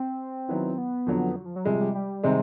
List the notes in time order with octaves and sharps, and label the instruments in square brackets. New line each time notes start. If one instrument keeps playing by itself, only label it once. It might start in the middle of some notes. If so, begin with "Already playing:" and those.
Already playing: [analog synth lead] C4
[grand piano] D#3 F#3 B3 E4
[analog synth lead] B3
[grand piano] F2 D3 F#3
[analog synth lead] F#3
F3
F#3
[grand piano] C3 F3 G#3 [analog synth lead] G3
[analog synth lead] G3
G3
[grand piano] C3 D#3 G#3 C4 D#4